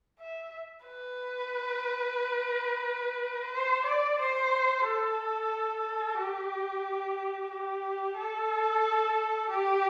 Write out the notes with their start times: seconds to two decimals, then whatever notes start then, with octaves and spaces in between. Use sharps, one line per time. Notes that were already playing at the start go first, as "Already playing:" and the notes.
0.19 E5
0.86 B4
3.52 C5
3.85 D5
4.19 C5
4.85 A4
6.18 G4
7.51 G4
8.17 A4
9.50 G4